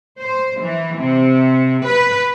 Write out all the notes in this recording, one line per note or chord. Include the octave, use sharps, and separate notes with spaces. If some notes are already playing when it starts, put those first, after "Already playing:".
C5
E3
C3
B4